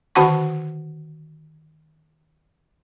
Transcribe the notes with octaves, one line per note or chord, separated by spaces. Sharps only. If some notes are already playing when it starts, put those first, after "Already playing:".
D3 D#3 F#4 F#5 A5 C#6